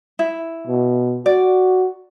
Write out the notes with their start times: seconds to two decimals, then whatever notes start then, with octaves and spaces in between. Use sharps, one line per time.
0.19 E4
0.67 B2
1.26 F#4 D5